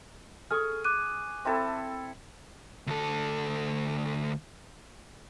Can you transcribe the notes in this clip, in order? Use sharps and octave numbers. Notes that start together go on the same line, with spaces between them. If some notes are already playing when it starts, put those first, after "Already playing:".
G#4 A4 C#6 F6
D6 F#6 D#7
C4 E4 A4
D2 A4